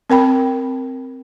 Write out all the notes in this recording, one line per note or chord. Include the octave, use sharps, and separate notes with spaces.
C4 A#4 G5 B5